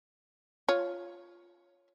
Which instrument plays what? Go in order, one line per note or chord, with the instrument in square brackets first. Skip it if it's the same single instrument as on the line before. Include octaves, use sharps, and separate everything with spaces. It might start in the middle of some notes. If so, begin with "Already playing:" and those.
[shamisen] F4 C#5